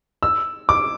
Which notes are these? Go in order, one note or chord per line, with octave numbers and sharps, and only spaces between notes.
E6
D6